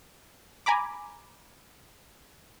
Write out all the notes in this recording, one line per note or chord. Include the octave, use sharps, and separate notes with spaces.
G#5 A#5 B5 D6